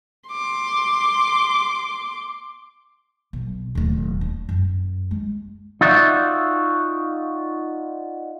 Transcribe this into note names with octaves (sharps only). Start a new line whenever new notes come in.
C6 D6
B1
D1 D#2
D4
F#2
G#3
D#4 F4 F#4 D5 E5